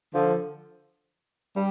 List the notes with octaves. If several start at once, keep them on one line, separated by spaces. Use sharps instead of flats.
D3 F3
G3